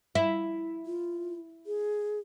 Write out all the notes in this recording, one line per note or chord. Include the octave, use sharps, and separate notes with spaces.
E4
F4
G#4